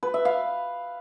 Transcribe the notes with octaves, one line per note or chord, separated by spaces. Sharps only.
B4
E5
F5